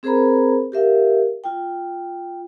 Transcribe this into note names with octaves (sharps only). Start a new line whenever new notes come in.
C4 G#4 A#4 C5 A#5 B5
G4 A#4 E5 F5
F4 G5